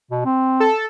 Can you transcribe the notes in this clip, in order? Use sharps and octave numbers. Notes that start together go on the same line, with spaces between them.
B2
C4
A4